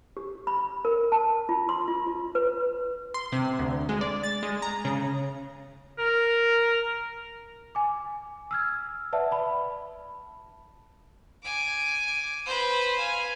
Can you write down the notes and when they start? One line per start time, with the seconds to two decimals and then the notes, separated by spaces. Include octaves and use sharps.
0.17 G4
0.47 B5
0.85 A#4
1.12 A5
1.49 F4
1.69 C6
1.88 F4
2.07 F4
2.35 B4
3.14 C6
3.32 C3
3.59 D2
3.89 G#3
4.01 D5
4.23 A6
4.43 G#3
4.62 A#5
4.85 C#3
5.98 A#4
7.75 G#5 D6
8.51 E6 F6 G#6
9.12 B4 D5 E5 F#5 A5
9.31 A5 B5
11.43 G#5 D6
12.46 B4 C5
12.97 F5 G#5